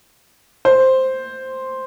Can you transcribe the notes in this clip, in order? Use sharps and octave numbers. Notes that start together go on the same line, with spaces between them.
C5